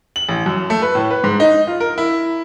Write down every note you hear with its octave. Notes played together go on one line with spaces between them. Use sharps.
F#7
A1
F#2
A3
B4
A2
B4
G#2
D#4
F4
A#4
E4